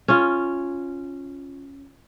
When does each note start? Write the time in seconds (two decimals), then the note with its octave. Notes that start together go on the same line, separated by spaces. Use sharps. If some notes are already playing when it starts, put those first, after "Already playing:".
0.08 C#4 F4